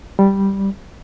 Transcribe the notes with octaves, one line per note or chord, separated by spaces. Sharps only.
G3